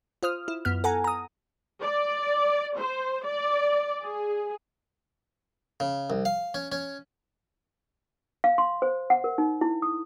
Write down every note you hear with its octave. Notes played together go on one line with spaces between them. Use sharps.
F4 C5 D#6 F6
E4
F#2 B3 F6
A4 F#5 G#5 A#5
A#5 D#6
D5
C5
D5
G#4
C#3
C2
F5
C#4
C#4
F5
C6
C5
F#5
A#4
D#4
E4
D#6